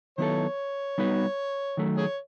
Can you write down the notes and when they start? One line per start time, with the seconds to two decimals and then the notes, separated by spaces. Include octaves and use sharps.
0.18 D#3 F#3 B3 E4 A4 C#5
0.98 G3 B3 D#4 F#4 B4
1.77 D#3 F#3 A3
1.97 G#4 C#5